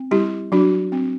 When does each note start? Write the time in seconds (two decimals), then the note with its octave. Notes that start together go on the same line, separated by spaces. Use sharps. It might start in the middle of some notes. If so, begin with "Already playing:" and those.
Already playing: C4
0.11 G3 E4 G4
0.52 F#3 D4 F#4
0.92 C4